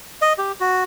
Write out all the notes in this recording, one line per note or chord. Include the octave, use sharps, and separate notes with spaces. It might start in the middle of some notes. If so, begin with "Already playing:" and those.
D#5
G4
F#4